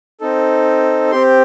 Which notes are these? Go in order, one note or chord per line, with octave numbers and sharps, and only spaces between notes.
C4 D#4 A4
C4 G4 C6